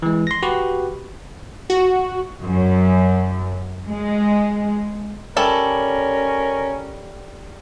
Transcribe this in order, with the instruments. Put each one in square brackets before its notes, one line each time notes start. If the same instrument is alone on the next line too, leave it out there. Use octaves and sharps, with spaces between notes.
[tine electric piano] E3 G#3
C6 A#6
F#4 G4 B4
[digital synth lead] F#4
[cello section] F#2
G#3
[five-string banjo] G3 A4 A5 [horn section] C#4 A#4